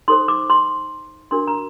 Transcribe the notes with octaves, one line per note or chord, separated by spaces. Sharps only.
D#4 A4 C5 C6
D6
C6
D4 F#4 A#4 C6
A#5